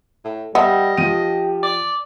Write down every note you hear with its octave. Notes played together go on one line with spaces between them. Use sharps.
A2
G3 B3 D#5 E5
F3 G4 G5 D#7
D5